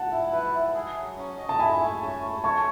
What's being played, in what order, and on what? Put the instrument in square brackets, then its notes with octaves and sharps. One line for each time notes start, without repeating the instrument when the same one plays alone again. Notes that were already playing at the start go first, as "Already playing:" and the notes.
Already playing: [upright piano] F#5 A5
[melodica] E4
B4
E4
G#4
F#3
C#4
D#5
[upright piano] A5
[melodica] E4 [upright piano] G#5 B5
[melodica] A3
C#4
A3
[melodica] C#5 [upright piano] A5 C#6